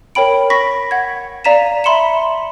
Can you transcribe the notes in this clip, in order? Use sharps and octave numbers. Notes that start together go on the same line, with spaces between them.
A#4 C#5 G5 B5 D7
B5 C#6 A#6 B6
F#5 G#6
D5 F5 A#5 B6 D#7 E7
E5 B5 C6 C#7 E7